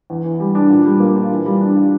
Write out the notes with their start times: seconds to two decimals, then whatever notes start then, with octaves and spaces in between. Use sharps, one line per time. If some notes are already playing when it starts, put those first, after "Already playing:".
0.10 E2
0.25 E3
0.40 G3
0.55 D4
0.70 A#2
0.85 G3
1.00 A#3
1.16 F4
1.31 E3
1.46 G3
1.61 D4
1.76 F4